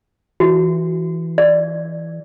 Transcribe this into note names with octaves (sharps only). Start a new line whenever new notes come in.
E3 F#4
D5